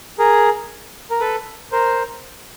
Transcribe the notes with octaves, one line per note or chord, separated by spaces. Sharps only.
G#4 A#4
A#4
A4 B4
A#4 C5